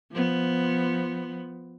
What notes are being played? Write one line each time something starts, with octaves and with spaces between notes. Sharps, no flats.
F3 B3